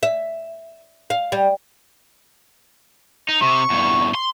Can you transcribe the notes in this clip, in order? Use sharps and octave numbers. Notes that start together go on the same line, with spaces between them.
E5
F5
G3
D#4
C3 C#6
E2 G2
C6